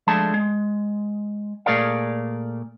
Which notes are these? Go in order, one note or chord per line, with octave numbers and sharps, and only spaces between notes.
F3 G#3 A3 D4 A5
G#3
A#2 A3 G#4 A#4 D5 F5